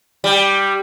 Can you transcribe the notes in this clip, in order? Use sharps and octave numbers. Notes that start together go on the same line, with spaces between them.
G3